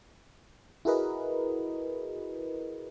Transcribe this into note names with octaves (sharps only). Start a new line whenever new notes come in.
E4 F#4 G#4 A#4 B4 D#5